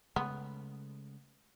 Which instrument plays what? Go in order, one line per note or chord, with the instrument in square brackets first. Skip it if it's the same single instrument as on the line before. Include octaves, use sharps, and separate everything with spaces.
[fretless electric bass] C#3 G#3 A3 [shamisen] B3